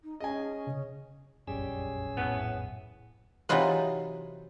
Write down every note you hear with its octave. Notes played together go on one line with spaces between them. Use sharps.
D#4
C#4 G#4 D#5 G#5
C#3
F1 A#1 F#2 G3 C#4 G#4 E6
A2 B3
C3 E3 F#3 D#4 F4 B4